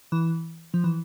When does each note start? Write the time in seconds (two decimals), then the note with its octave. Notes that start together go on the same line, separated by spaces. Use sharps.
0.12 E3
0.74 F3
0.84 E3